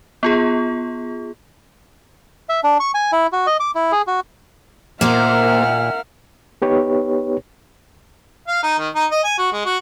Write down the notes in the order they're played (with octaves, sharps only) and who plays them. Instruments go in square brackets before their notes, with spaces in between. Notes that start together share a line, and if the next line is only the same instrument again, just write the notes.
[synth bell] B3 F4 G#4
[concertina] E5
D4
C#6
G#5
E4
F#4
D#5
D6
E4
G#4
F#4
[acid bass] A#2 [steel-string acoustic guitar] A#3 C5 [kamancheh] A#4 F6 [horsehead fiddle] E5 F#5
[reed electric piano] B3 D#4 G4 B4 C#5
[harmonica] F5
D#4
D#3
D#4
D#5
G#5
F#4
G#3
F#4